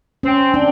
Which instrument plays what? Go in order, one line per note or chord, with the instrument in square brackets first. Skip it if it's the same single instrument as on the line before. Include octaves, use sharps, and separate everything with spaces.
[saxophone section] C4 [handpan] C#4
[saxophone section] C4 [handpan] D4